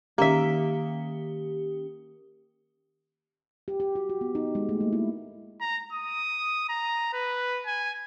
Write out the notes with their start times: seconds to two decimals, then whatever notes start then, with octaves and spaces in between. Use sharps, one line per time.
0.18 D#3 A#3 C#4 G4 E5
3.68 G4
3.80 G4
3.95 F#4
4.10 F#4
4.21 B3
4.35 D#4
4.55 G#3
4.69 A3
4.81 A#3
4.93 E4
5.61 A#5
5.92 D#6
6.69 A#5
7.13 B4
7.66 G#5